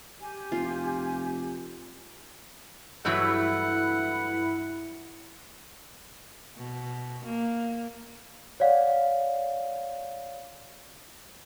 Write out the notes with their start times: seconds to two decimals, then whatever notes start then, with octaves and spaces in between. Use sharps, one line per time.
0.21 G4 G#5
0.52 F1 F4
3.05 G2 E3 F#3 A3 E4 F#5 B5
6.57 B2
7.25 A#3
8.60 C#5 D5 F5 F#5